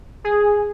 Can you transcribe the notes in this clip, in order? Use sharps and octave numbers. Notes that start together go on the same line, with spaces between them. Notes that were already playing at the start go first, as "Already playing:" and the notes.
G#4